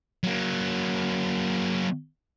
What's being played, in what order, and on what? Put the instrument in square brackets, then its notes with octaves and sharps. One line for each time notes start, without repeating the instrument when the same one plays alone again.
[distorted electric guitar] F#3 A#3